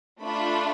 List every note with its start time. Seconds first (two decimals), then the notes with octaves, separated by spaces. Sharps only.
0.21 A3 D4 F4 B5